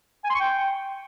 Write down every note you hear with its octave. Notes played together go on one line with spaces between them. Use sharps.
G#5
C6
C#6
G5